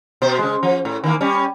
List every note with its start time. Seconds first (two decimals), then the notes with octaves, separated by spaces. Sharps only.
0.22 B2 C5
0.39 C#3 G#3
0.63 F3
0.85 A2
1.04 D#3 E3 A#3
1.21 G3 C#4